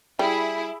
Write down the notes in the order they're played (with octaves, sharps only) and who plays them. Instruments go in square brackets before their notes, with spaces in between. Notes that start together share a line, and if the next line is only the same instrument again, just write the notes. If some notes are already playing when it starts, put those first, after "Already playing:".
[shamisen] G3 [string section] E4 [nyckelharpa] G#4 [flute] E5